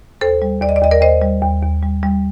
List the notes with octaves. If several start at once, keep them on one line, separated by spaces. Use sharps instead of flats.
D#2 A4 C5
G3
D#2 D5
D#5
D5
D#2 D#5
A#4 D5
D#2 C5 D#5
G3
D#2
D#2
G3
G3